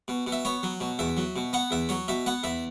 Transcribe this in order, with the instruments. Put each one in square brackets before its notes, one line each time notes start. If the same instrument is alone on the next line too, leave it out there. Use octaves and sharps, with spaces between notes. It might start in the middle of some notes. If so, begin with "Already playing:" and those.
[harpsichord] B2
B2
E5
B3 C#5
F#3
B2
E2 E5
F#3
B2
B3 F#5
E2 E5
F#3 C#5
B2 E5
B3 F#5
E2 E5